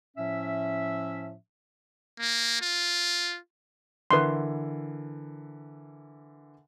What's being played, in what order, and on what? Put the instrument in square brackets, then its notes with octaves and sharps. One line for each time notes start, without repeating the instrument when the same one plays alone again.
[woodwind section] A2 F3 C#4 E5
[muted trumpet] A#3
F4
[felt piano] D3 E3 A#4 [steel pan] B4 C6